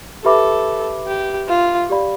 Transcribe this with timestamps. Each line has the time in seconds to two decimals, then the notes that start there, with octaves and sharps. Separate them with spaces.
0.24 G4 A4 B4 E5 B5 D6
1.07 G4
1.48 F4
1.90 G4 D5 F5 B5